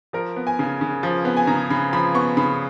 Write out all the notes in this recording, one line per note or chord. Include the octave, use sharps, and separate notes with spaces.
F3 A#4
B3
G#5
C#3
C#3
F3
B3
G#5
C#3 A#5
C#3 B5
F3 B5
B3 C#6
C#3 B5